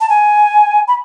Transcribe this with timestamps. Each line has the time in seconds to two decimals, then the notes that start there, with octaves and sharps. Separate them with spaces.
0.01 A5
0.10 G#5
0.88 B5